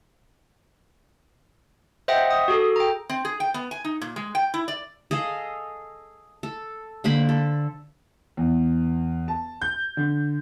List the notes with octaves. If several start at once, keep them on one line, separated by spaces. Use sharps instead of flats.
C5 D#5 E5 F#5 G5
D#6
F#4 G#4 A4
G5 A#5
C4
G#4
G5
B3
G#5
D#4
A#2
G#3
G5
E4
D5
G#4 A4 D#5 F5
A4
D3 A#3 C5 B5
A4
E2
A5
G6
D3